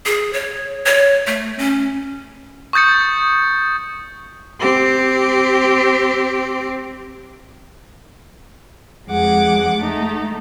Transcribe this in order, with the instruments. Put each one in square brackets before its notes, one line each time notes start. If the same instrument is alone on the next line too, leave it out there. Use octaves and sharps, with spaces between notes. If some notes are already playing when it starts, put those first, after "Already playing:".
[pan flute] G#4
C#5
C#5
A3
C#4
[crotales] C#6 D#6 G6 A6 C#7
[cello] C4 G4
[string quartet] F2 G#3 G#4 F#5 D6
A3 D#4